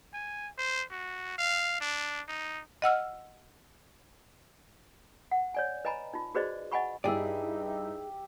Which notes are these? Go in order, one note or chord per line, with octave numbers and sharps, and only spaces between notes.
G#5
C5
F#4
F5
D4
D#4
D#5 F#5 E6 F6
F#5
C#5 D5 G#5
B4 D#5 G#5 A#5 B5
D#4 F4
F#4 G#4 B4 C5 D5 D#5
D#5 F#5 G#5 B5 C#6
G2 D#4 E4 G4 G#4 D5 E5